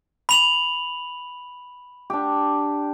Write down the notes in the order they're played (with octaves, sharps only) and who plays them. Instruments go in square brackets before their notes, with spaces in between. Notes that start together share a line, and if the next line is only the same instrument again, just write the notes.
[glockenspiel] B5 F7 F#7
[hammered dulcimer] D4 G4